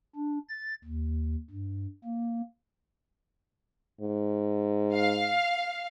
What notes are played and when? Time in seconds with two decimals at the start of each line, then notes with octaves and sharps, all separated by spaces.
0.16 D4
0.49 A6
0.84 D#2
1.50 G2
2.05 A#3
4.01 G#2
4.95 F5